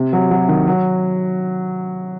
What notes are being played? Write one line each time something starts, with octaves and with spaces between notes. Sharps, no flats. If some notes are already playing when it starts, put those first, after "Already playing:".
Already playing: C3
F#3
F#3
D#3
F#3